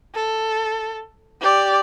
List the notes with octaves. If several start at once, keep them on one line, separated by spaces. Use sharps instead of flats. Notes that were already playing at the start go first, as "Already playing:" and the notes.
A4
G4 D5